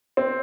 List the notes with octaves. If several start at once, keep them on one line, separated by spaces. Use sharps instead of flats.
C4